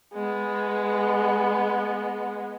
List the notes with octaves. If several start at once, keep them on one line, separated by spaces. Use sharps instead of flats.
G#3 B3